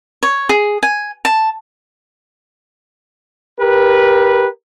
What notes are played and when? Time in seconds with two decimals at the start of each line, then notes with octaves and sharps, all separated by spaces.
0.23 C#5
0.49 G#4
0.83 G#5
1.25 A5
3.59 G4 A#4 B4